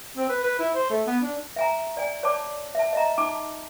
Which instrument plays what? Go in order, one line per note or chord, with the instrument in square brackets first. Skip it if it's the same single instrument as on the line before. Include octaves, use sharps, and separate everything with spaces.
[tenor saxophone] C4
B4
B4
E4
C5
A3
B3
D4
[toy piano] E5 G#5 A#5
D5 G#5
C#5 D5 A5 D6
E5 A5
D#5 E5 A#5
D#4 A5 D6